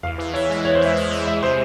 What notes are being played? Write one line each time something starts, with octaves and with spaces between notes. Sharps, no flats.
E2 F5
E3
E4 C#5
G#3
E2 C#5
C5
E3 E5
E4
G#3
E2 E5
C3 C5